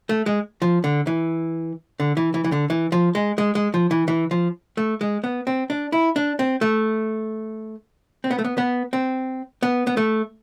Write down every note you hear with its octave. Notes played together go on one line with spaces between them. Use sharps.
A3
G#3
F3
D3
E3
D3
E3
E3
E3
D3
E3
F3
G#3
G#3
G#3
F3
E3
E3
F3
A3
G#3
B3
C4
D4
E4
D4
C4
A3
C4
B3
A3
B3
B3
C4
B3
B3
A3